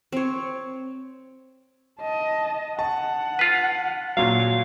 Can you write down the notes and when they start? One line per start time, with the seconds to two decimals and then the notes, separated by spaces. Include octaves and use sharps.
0.12 C4 C#5
2.01 D#5 A5
2.79 F#5 A5
3.39 F4 B4
4.17 A#2 F#3 F5